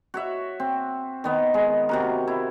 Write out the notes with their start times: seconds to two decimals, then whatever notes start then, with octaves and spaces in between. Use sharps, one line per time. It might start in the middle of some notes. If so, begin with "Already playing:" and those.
0.14 F#4 C#5 E5
0.60 C4
1.24 D#3 B3
1.54 G#3
1.89 C3 F#4 A#4
2.28 E4